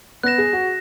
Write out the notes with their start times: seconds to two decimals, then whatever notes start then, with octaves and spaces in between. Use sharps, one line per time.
0.23 B3 F#6 A#6 E7
0.38 G#4
0.53 F#4